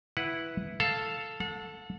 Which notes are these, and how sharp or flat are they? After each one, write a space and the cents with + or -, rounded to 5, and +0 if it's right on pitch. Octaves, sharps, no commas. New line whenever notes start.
E4 +0 B4 +0 F#5 +0
A4 +0 F5 +0
A4 +0 F#5 -40